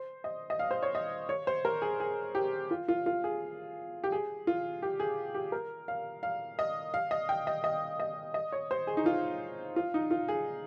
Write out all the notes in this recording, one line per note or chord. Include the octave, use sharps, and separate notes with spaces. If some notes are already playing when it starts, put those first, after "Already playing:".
Already playing: C5
D#5
D#5
F5
C5
C#5
D#5
C#5
C5
A#4
G#4
G#4
G4
F4
F4
F4
G#4
G4
G#4
F4
G4
G#4
G4
A#4
F5
F5
D#5
F5
D#5
G5
D#5
D#5
D#5
D#5
C#5
C5
G#4
D#4
F4
F4
D#4
F4
G#4